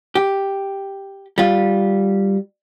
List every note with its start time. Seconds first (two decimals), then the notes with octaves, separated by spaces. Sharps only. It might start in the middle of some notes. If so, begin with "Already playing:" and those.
0.15 G4
1.38 G3 F4